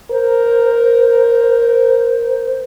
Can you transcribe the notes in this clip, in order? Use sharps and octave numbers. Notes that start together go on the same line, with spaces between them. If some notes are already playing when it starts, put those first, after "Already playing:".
A#4 C5